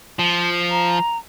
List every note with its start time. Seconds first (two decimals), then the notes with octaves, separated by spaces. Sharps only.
0.19 F3
0.71 A#5